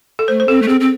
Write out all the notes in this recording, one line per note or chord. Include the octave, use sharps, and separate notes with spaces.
A4
A3 C5
C5
C4 A4
A3
C4 G#4
C4